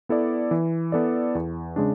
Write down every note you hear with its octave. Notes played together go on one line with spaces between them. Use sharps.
B3 E4 A4 D5
E3
B3 E4 A4 D5
E2
C#3 G#3 D4